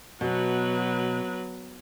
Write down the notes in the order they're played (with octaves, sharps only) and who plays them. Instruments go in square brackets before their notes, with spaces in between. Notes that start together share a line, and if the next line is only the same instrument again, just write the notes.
[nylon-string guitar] B2 [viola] F#3 B4